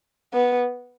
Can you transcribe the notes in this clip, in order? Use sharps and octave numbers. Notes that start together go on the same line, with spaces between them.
B3